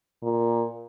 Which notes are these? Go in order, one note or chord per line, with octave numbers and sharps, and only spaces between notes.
A#2